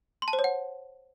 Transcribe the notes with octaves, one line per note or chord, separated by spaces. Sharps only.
C6
A5
C5
C#5
F#5